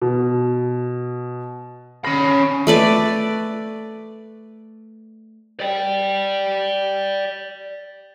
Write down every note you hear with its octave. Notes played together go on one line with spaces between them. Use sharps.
B2
C#4 B5 A#6 C7
A3 B4 D5
D5 G5